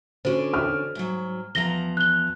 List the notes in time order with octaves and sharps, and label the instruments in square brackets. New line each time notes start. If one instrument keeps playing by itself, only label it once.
[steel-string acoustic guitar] D3 C#4 D5 [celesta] F#4 C5
[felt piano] F6
[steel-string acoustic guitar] G#2 F#3
[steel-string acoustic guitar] E2 F3 A#5 [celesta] A#6 G7
[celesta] F#6 G7